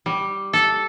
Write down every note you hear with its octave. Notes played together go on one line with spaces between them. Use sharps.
G3
A4